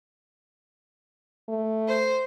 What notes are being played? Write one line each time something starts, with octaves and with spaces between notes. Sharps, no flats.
A3
C5